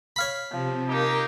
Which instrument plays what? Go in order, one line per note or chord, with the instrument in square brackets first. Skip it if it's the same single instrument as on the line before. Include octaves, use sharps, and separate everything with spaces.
[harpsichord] C#5 F5 B5
[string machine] C3 [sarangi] F3
[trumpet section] A#3 D#4 G4 [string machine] A#4